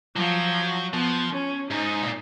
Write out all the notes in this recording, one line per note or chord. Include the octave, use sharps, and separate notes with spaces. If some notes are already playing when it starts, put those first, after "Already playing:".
F3 F#3
F3 B3
C#4
G#2 D#4
A#2